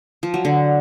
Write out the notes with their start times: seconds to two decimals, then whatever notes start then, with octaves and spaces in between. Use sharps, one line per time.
0.23 F3
0.34 F#3
0.45 D3